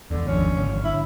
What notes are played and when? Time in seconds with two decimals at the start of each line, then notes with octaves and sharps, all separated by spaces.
0.11 F1 E2 D3
0.27 G#1 F3 C#4
0.56 G#1 D3
0.84 E4